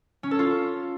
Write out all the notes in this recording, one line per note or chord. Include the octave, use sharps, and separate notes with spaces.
C#4
A4
F4